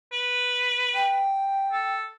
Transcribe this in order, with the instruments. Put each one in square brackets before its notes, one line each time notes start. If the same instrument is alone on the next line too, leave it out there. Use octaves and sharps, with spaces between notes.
[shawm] B4
[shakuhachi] G5
[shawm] A4